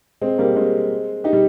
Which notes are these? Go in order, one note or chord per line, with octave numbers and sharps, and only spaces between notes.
G#3 C4
G3 A#3
G#3 C4
D#4 G4
G3